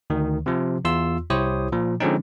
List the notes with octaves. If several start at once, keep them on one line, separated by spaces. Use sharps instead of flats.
D2 D#3
C3 F3
E2 F4 C6 E6
C2 E4 G4 C5 C#5 D#6
A#2 F3
D3 F3 G#3 C4 C#4 D#4